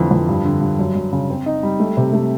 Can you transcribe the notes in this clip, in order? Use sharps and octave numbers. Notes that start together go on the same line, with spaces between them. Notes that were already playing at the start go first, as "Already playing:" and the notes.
Already playing: F2 D3 E3
F2
G2
D3
G2
F#2
F#2
C#3
C4
D#4
G3
A3
C3
A3